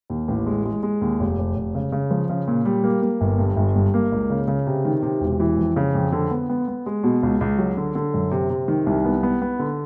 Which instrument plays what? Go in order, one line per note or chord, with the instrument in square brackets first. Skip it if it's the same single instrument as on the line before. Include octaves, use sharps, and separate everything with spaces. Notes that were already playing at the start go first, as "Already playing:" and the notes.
[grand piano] D#2
A1
G#3
G#3
G#3
D#2
F1
F1
F1
C#3
C#3
F3
C#3
A#2
G3
A#3
A#3
G1
G2
G1
G2
A#3
C#2
C#3
C#3
C3
D#3
C3
E1
E3
F2
C#3
F2
D3
B3
B3
B3
G#3
B2
C#2
C#2
F#3
D3
D3
F#2
C3
C3
D#3
C2
B3
B3
B3
D3